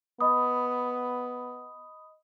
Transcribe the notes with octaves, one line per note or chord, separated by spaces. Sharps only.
B3 D#5 B5 D#6